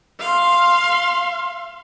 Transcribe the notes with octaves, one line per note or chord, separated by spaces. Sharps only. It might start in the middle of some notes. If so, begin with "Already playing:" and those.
F5 C6